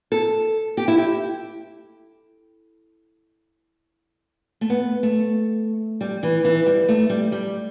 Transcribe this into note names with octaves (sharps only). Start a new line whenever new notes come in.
A4
G4
E4
G4
A3
B3
A3
G3
E3
E3
G3
A3
G3
G3